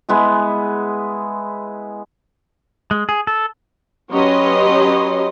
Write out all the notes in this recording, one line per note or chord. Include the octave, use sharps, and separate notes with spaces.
G#3 B3 E4 G#4
G#3
G#4
A4
F#3 C#4 G4 B4 D#5 C6